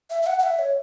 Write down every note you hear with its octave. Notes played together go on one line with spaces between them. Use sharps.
E5
E5
F#5
F#5
E5
C#5